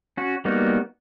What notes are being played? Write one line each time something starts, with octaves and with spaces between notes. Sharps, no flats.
C#4 F#4
G3 A#3 B3 D#4 F#4